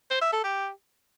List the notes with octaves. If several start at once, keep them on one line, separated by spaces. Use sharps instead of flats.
C5
E5
A4
G4